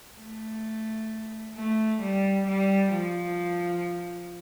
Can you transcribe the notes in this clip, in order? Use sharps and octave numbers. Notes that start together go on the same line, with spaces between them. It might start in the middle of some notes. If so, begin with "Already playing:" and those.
A3
A3
G3
G3
F3